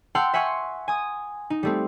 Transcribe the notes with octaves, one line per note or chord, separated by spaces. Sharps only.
F#5 G5 A5 C6 E6 F6
E5 F#5 G#5 C6 C#6 F6
G#5 D#6
D#4
G3 A3 C4